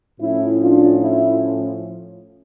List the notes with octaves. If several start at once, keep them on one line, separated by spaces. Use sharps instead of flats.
A2 F3 C#4 E4
D4 F4
E4